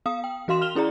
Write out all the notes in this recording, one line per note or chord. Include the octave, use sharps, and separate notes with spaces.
B3 F5 D#6
G5
E3 F#4 F5 C6 E7
F6 F7 G7
C#4 E4 G#4 D5 A#5